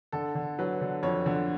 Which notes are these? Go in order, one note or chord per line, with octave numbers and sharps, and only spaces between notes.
D3 A4
D3
F#3 B4
D3
F2 C#5
D3